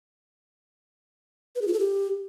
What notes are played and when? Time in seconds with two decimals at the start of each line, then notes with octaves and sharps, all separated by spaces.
1.56 B4
1.62 G#4
1.68 F4
1.73 A4
1.79 G4